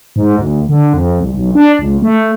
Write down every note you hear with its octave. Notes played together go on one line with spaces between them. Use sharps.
G#2
D2
D3
F2
C2
B1
D4
C#2
A3